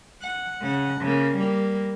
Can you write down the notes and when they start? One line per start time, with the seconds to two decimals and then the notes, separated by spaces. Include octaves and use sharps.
0.22 F#5
0.62 C#3 F#5
1.01 C#3 A#3
1.36 G3 A#3